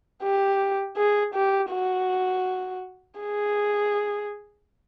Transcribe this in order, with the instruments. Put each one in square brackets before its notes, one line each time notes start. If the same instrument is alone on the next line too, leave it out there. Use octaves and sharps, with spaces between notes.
[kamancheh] G4
G#4
G4
F#4
G#4